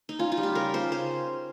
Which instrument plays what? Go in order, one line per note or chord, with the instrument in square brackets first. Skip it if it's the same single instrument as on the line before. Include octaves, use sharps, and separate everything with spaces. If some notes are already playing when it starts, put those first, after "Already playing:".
[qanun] D#4
C#4 F4
F4
G3
G4
C#3 A#4
C#3 C5
C#4 C5